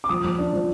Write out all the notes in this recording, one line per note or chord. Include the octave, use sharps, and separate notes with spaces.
D6
F3 D#6
F3
D4
F3